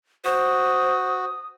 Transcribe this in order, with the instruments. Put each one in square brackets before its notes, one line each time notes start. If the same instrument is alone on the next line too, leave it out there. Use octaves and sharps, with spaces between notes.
[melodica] F#4 [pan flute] C5 [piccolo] D#6